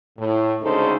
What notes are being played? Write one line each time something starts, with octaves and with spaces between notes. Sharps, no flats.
A2
D2 C#3 G#3 D#4 A4 C5